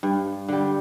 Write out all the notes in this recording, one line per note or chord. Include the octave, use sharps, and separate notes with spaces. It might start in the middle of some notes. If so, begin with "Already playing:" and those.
G2
D3 G3